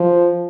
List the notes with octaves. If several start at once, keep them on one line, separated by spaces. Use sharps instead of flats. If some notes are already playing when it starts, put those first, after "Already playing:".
Already playing: F3